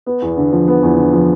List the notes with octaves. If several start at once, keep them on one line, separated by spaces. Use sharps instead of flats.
B3
E2
D3
F3
B3
E2
D3
F3